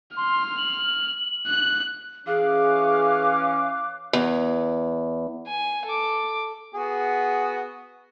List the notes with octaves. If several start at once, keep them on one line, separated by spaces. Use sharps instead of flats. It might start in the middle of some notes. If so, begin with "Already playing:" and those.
C6 F6
F#7
F#6
E3 C#4 G#4 F5 D6 F#6
E2
G#5
A4 D6
B3 F#4 G#4